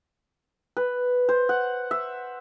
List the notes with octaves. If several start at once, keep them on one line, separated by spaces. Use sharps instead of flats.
B4
C5
F#5
E5